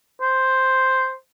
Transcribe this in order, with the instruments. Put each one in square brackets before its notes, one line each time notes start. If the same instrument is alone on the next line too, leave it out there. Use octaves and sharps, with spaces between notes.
[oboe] C5